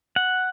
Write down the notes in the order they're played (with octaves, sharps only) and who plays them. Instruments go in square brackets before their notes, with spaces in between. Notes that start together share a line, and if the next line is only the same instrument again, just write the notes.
[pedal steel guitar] F#5